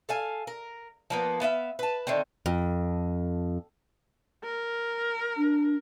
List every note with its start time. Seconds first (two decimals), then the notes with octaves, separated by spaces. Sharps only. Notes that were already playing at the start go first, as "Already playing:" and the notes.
0.09 A4 F5 G#5
0.47 A#4
1.10 F3 A#3 B3
1.41 B3 E5 F5
1.79 B4 A5
2.07 D3 D#3 A3 C4
2.46 F2
4.44 A#4
5.37 D4